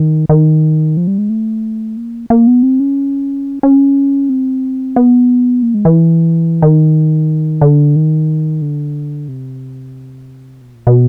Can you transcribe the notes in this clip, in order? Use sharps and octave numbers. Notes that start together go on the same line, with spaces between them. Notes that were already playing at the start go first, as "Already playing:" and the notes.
Already playing: D#3
D#3
F3
G3
G#3
A3
A#3
A#3
B3
C4
C#4
C#4
C4
B3
A#3
G#3
E3
D#3
D3
D#3
D3
C3
B2
A#2
B2